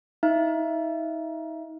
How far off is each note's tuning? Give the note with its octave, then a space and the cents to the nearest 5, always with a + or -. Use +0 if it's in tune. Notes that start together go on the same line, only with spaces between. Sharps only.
D#4 +35 E5 +35